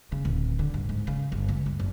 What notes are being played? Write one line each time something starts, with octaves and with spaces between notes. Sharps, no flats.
C#3
D1
D3
G2
G#2
C#3
G1
C#2
G2
F#1